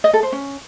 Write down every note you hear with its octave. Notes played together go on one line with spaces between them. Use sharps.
D#5
A4
C5
C#4